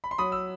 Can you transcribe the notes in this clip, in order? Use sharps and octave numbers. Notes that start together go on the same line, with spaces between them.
B5
C6
F#3 B5 D#6
E6